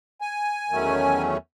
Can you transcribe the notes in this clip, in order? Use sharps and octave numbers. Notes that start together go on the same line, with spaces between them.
G#5
E2 D#3 F#3 A3 C#4